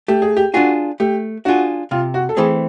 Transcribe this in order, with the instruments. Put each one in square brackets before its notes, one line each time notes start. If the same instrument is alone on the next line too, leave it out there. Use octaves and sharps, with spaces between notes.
[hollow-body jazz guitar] A3 [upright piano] G4
[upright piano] G#4
G4
[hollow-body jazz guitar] D4 F4 G#4 [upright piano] F#4
[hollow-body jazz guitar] A3 [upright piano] G4
[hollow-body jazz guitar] D4 F4 G#4 [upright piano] F#4
[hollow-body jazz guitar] C3 [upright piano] F4
[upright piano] F#4
A4
[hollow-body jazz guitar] E3 A3 C4 [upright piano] G#4